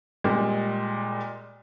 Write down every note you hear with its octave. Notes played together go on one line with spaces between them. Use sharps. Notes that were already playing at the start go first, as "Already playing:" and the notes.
A#2 G3 G#3